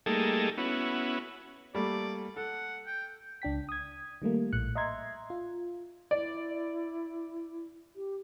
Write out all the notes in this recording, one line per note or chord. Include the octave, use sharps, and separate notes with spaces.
G3 A3 A#3 D#4 G#4 A4
B3 C#4 E4 F#4
G3 A3 A#3 D5
A4 F#5
G5
C#2 D4 G5 B6
D#6 G#6
D#3 G3 A3 A#3
A#1 A2 F#6 C#7
D#5 E5 A#5 C6 G#6
F4
E4 D5
G4